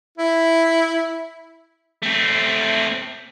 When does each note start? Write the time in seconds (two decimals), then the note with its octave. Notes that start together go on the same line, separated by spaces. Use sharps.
0.18 E4
2.02 A3 C4